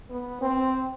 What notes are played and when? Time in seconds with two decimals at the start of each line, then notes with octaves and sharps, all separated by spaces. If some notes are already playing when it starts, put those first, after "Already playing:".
0.10 B3
0.41 C4